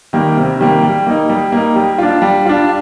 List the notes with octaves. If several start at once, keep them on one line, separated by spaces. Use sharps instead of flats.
D#3 G3 A#3
C3
D#3 G3 A#3
G3
A#3 D#4
G3
A#3 D#4
G3
D4 F4
G3
D4 F4